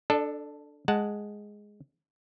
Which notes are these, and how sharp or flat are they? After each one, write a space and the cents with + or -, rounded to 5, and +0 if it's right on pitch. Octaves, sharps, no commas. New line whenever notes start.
D4 +0 A4 +0 D5 +45
G#3 +0 F#5 +0 A5 +0